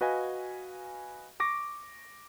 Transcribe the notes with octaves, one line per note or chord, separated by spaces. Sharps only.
F#4 B4 D#5 F5 G#5
C#6 D6 A#6